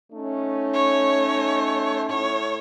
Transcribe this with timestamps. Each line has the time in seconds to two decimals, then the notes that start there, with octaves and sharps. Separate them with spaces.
0.12 A3 C#4 D#4
0.74 C#5
2.09 A2 C#5